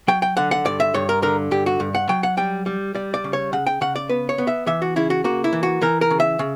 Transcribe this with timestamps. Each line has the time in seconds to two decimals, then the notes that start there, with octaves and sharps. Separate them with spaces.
0.08 F#3 G5
0.22 G5
0.37 D3 F#5
0.51 F#5
0.65 G2 D5
0.80 E5
0.94 G2 C#5
1.09 A#4
1.22 D3 A#4
1.51 G2 G4
1.66 F#4
1.80 G2
1.95 F#5
2.09 F#3 G5
2.23 F#5
2.37 G3 G5
2.66 G3
2.95 G3 D5
3.14 D5
3.24 C#3
3.33 C#5
3.53 C#3 F#5
3.67 G5
3.81 C#3 F#5
3.96 D5
4.09 B3 B4
4.29 C#5
4.38 B3
4.47 E5
4.67 E3 E5
4.82 F#4
4.96 C#3 E4
5.10 F#4
5.24 A#3 F#4
5.44 E4
5.53 E3
5.63 F#4
5.81 E3 A#4
6.01 A#4
6.10 C#3
6.20 E5
6.39 C#3